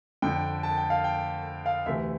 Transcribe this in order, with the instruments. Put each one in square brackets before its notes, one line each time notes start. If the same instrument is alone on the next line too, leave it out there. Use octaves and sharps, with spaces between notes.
[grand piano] F2 D3 G5
A5
G5
F5
G5
F5
D2 C3 E3 E5